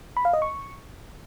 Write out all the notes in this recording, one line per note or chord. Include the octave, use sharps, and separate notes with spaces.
B5
F5
D#5
C#6